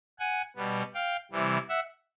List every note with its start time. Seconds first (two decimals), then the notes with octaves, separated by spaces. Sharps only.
0.19 F#5 G#5
0.56 B2 G3 B3
0.94 F5 G5
1.32 C3 E3 G3
1.69 E5 F#5